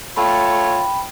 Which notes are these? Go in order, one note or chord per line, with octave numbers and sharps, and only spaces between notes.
A3 F4 C#5 G5 B5